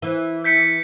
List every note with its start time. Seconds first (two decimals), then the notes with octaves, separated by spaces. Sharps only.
0.02 E3
0.44 G6 B6 C#7